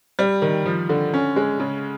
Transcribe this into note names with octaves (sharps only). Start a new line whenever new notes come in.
G3
D#3
F3
D3
C#4
G#3
C#3